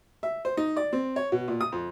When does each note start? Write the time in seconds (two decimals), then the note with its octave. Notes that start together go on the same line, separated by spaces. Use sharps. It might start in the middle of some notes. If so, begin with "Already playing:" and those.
0.23 E5
0.45 C5
0.57 D#4
0.77 D5
0.93 C4
1.16 C#5
1.32 B2
1.48 A#2
1.61 D#6
1.72 F2